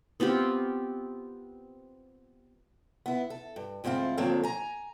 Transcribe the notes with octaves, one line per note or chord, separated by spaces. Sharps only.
B3 C4 F4 G4
B3 E4
A4
G2
D2 G#2 C4 E4 F4
D3 F3 A#3 C4 A4 C#5
G#5 A#5